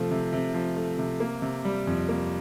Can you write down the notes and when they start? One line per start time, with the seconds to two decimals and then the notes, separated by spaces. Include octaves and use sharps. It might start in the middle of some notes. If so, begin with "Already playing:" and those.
Already playing: C3 F3 A3
0.11 C3
0.33 C3
0.54 F3
0.76 A3
0.98 C3
1.20 A#3
1.42 C3
1.65 G3
1.87 F2
2.09 A#3